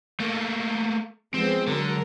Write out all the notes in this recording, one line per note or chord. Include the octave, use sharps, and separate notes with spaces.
A3 A#3
F3 G#3 B3 C4
D3 F#3 A#4